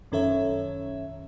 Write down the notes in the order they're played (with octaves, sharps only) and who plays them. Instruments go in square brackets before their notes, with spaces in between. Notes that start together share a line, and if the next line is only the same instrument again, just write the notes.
[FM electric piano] F#2 D#3 C#4 A4 C#5 E5